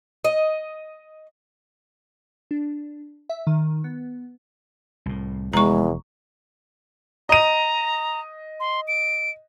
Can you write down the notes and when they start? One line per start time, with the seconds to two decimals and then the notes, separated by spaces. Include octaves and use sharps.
0.24 D#5
2.51 D4
3.29 E5
3.47 D#3
3.84 B3
5.06 C2 A2
5.53 F1 E2 G#3 A#5 C#6
7.29 D#5 A#5 D#7
8.60 C6
8.88 D7